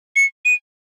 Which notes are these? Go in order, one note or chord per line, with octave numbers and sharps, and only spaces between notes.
C#7
D#7